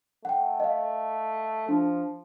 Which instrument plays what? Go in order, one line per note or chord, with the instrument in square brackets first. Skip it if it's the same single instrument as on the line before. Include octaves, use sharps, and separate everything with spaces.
[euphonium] A3 [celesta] F#5 G5
[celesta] D#5 F5
[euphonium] F3 [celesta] D4